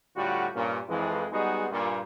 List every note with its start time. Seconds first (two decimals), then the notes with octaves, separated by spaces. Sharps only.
0.16 A2 D3 G3 F4 F#4
0.55 G2 A#2 C#4
0.88 F2 E3 G#3
1.31 G3 G#3 B3 D#4 F#4 G#4
1.71 G2 A#2